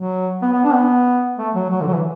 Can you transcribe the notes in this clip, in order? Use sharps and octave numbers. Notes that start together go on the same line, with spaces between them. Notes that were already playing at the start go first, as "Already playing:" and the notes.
Already playing: F#3
B3
B3
D4
B3
A3
F#3
F#3
D3
F#3
E3